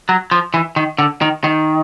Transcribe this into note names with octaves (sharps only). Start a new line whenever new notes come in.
F#3
F3
E3
D#3
D3
D#3
D#3